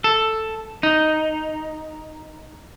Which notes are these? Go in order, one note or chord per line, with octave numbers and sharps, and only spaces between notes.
A4
D#4